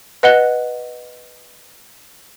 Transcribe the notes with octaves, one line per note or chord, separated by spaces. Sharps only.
B4 D#5 F#5 F#6 G7